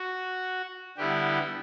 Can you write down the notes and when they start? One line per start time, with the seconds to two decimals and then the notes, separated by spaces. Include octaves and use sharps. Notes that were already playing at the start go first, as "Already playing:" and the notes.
Already playing: F#4
0.97 D3 G3 B3 E4 G4